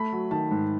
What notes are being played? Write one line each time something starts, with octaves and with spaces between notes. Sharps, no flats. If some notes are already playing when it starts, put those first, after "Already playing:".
Already playing: A3 B5
F#3
D#3 A5
G#2